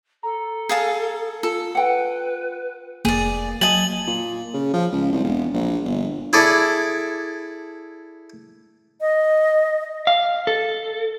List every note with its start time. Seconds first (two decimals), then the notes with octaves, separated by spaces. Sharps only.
0.23 A4 A#5
0.69 G#4 F5 A5
1.43 F4 A4
1.75 B4 F#5 G5
3.05 F1 A#3 G#4 D5
3.61 F#3 D#5 G#5 A5 F#7
4.07 A#2
4.54 C#3
4.74 F3
4.92 C#2
5.12 C2
5.24 E1
5.54 A#1
5.85 G1
6.33 E4 G#4 A4 D5
9.01 D#5
10.07 F5
10.47 A4